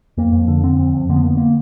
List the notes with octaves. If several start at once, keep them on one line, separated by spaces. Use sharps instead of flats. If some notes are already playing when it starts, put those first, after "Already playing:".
F2 A#3
F2
D3
D3 C4
F2
F2
D3 A#3
B3
D3 A#3
B3
A#3